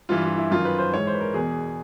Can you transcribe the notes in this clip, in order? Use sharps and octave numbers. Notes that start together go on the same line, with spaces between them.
G2 E3 F4
F4
E4
F#2 D#3 F4
B4
C5
G#2 E3 C#5
C5
B4
A#4
E2 B2 G#4